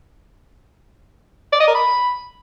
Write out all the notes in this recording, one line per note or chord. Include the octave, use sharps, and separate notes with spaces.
D5
D#5
A#4
B5